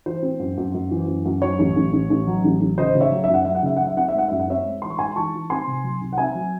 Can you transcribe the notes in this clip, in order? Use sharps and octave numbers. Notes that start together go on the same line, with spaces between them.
E3 C5
C4
F#2
F#2
F#2
E3
F#2
F#2
F#3 C#5
A1
A1
A1
A1
F#3
A1
A1
C#3 C5 D#5
C#3
C#5 E5
F#3
F#2 E5
F#5
F#3 E5
F#5
C#3 E5
F#3 F#5
E5
C4 F#5
E5
G#3 F#5
F#2 E5
F#5
C4 C#5 E5
G#3
E3 C6
C#6
G#3 G#5 C6
E3 A5 C#6
E3
C4 G#5 C6
C3
F#3
C2
F#5
C4 E5 G#5
F#3